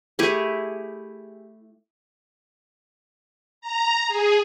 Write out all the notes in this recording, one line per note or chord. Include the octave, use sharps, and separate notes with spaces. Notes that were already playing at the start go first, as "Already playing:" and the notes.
A3 E4 G4 G#4
A#5
G#4